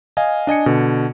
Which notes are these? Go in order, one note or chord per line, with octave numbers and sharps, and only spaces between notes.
D#5 F5 G#5
D4 D#5 G#5 C#7
B2 D3